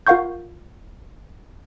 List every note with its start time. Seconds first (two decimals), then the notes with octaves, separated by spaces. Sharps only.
0.07 F4 A#4 F5 F#5 C#6 G6